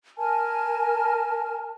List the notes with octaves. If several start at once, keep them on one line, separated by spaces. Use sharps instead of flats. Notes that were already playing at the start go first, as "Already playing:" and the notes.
A#4 G#5 A5 F6